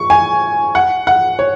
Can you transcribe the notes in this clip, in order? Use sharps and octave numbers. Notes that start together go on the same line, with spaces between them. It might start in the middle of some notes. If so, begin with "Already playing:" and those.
Already playing: C#6
G#5
F#5
F#5
C#5